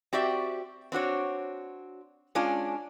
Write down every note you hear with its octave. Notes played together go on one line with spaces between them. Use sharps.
C4 F#4 G4 D5 E5
C4 D4 F#4 C#5
G#3 C#4 D4 F4